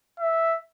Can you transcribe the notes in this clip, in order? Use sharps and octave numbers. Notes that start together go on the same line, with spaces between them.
E5